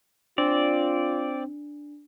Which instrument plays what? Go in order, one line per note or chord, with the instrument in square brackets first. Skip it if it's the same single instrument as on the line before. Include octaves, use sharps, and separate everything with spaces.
[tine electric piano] C4 [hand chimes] D4 [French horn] F4 [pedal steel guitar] D5